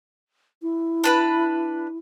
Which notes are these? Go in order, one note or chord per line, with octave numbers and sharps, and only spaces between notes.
E4
D4 B4 B5